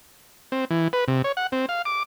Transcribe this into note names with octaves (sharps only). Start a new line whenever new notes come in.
C4
E3
B4
C3
C#5
F#5
C4
F5
D6